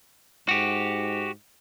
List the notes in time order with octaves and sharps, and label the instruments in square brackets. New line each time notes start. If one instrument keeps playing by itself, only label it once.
[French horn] G#2 [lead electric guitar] F#4 G4